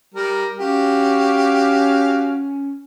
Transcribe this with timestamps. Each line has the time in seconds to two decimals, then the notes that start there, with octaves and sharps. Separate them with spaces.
0.15 G3 A#4
0.59 C#4 F#4 G4 F5